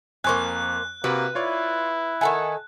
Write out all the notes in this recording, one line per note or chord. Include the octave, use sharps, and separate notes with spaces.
F2 A#3 C5 G#5 C#6 F#6
C3 A#3 F#4 B4
E4 F4 C#5 D5
D#3 A4 E5 F#5 G#5 A5